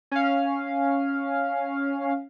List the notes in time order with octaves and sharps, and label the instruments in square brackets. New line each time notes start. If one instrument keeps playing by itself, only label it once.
[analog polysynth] C#4 F5